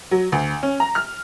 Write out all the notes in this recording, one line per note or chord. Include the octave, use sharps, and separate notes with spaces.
F#3
D2
C#4
A#5
F6